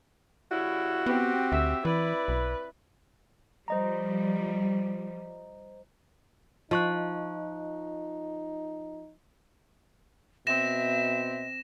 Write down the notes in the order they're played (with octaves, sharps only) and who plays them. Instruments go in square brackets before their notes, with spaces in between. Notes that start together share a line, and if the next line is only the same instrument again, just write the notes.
[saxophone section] C#3 G3 E4 [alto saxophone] F#4
[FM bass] B3 [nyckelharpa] C4 G4
[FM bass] D2 [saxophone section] E5
[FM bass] E3 [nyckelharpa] E4 D5 [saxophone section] B4
[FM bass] B1
[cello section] F3 G3 [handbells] C5 D#5 A#5
[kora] F3 [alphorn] D#4 [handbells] D#5 C#6 F#6
[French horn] B2 [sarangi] C4 [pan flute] E5 [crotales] A#6 E7